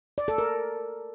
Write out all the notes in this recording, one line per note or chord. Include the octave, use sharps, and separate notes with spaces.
D5
A4
A#4